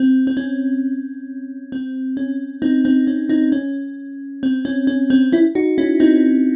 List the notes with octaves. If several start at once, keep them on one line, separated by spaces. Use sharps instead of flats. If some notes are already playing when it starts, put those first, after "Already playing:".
Already playing: C4
C4
C#4
C4
C#4
C4 D#4
C4 D#4
C#4
C4 D#4
C#4
C4
C#4
C#4
C4
C#4 E4
D#4 F#4
C#4 E4
C4 D#4